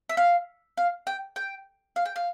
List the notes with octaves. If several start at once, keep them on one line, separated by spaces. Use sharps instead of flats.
E5
F5
F5
G5
G5
F5
G5
F5